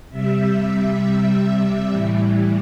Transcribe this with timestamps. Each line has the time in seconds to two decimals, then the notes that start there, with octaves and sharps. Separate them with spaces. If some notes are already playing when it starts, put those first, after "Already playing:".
0.10 C3 G3 E5
1.89 A2 E3 G3